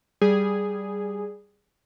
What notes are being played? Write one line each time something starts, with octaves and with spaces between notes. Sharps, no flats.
G3 G#4